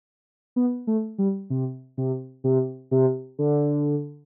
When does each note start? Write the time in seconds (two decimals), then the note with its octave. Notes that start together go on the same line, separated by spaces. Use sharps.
0.56 B3
0.87 A3
1.18 G3
1.50 C3
1.98 C3
2.44 C3
2.91 C3
3.39 D3